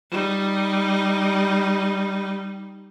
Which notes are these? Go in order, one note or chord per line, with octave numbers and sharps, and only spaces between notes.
G3 D#4